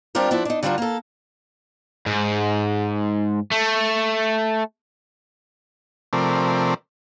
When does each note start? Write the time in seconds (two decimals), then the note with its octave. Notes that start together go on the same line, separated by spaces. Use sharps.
0.15 G3 C4 D4 F4 G4 A#4
0.31 F3 B3 D4 E4
0.45 D4 D#4
0.63 D3 G3 D4 F4 F#4 A#4
0.78 A#3 A4
2.06 G#2
3.52 A3
6.13 C3 F3 A3 C4 A#4 D5